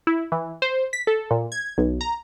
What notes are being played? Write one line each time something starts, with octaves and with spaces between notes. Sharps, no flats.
E4
E3
C5
B6
A4
A#2
G#6
B1
A#5